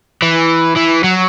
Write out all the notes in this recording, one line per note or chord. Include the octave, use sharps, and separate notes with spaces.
E3
E3
F#3